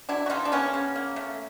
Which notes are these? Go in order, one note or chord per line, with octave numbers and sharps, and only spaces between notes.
F#3 D4 E4
F#4
C#3 D#4 F4
D4
A#3 B3 C#4
C#3
A#3
A3